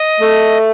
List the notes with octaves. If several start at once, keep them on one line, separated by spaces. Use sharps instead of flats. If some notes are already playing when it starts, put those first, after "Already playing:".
Already playing: D#5
A3